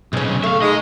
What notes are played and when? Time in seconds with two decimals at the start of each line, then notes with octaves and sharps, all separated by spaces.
0.13 B1 C#3 G#3 C#4
0.44 A3 E5 F5 C#6
0.62 G#3 D#4 D#5